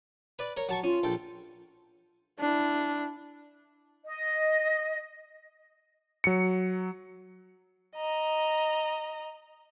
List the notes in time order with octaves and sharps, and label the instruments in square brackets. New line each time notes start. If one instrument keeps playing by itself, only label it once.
[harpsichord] B4 D5
A#4 C#5
F#3 A5 C#6
[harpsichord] C#4 [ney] F4
[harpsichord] A#1 A4 G5
[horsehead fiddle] D4 E4
[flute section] D#5
[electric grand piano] F#3 C#7
[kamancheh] D#5 A#5